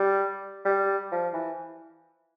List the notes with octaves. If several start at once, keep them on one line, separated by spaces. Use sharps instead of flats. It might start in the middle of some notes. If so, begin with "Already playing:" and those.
Already playing: G3
G3
F3
E3